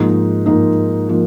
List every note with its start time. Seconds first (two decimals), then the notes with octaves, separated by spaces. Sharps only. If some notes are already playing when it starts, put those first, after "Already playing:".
Already playing: G#2 F3 A#3 D#4
0.46 G#2 F3 A#3 D#4
1.09 F3 A#3 D#4